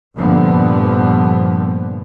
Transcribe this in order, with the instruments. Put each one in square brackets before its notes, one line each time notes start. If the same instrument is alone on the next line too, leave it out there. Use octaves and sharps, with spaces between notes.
[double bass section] F1 G2 A#2 D3 F3 B3